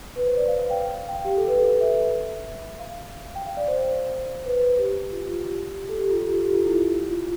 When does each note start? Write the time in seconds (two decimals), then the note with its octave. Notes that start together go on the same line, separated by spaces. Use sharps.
0.16 B4
0.26 C5
0.37 D5
0.48 F5
0.60 F5
0.70 G5
0.82 F5
1.09 G5
1.14 F5
1.25 G4
1.36 A4
1.47 B4
1.59 A4
1.81 E5
2.79 F5
3.35 G5
3.46 F5
3.57 D5
3.68 C5
4.45 B4
4.56 B4
4.78 G4
5.12 F4
5.27 F4
5.44 G4
5.89 A4
5.99 G4
6.11 F4
6.22 G4
6.33 A4
6.44 G4
6.54 F4
6.65 E4
6.76 E4
7.09 F4